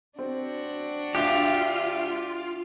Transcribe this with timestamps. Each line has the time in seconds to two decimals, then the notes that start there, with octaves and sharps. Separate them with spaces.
0.19 C4 D4 F#4
1.15 D2 F4 G4 F5 F#6